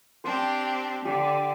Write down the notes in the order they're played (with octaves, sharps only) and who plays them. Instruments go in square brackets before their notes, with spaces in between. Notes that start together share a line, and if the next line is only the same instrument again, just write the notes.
[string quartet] C4 D4 G4 [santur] C5
[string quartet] D3 [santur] G4